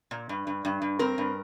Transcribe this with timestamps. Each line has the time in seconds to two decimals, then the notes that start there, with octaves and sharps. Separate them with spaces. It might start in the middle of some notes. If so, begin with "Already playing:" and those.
0.11 A#2
0.29 G2
0.47 G2
0.65 G2
0.82 G2
0.99 C4 A#4
1.18 G2